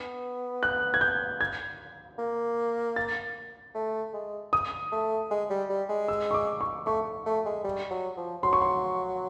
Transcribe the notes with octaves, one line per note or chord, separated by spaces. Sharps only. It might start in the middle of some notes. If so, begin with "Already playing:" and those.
Already playing: B3
F#6
G#6
G6
G#6
A#3
A6
A3
G#3
D#6
A3
G#3
G3
G3
G#3
E6
C#6
D6
C#6
A3 C#6
A3
G#3
G3
F#3
F3
F#3 C6
C#6
C6